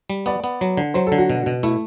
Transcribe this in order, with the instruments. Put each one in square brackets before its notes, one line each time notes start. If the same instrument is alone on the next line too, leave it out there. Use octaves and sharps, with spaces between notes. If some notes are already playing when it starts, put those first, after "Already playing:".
[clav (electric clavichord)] G3
[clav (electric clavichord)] B3 [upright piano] D5
[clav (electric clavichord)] B3
F#3
D3
[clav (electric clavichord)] F#3 [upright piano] C5
[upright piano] A4
[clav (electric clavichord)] D3
[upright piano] F#4
[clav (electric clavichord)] B2
B2
[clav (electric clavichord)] A3 [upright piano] E4